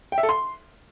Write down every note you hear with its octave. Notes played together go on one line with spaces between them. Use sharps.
G5
E5
A4
C6